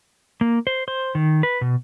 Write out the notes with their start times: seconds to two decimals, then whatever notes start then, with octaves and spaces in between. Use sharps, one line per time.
0.41 A#3
0.67 C5
0.88 C5
1.15 D#3
1.43 B4
1.61 B2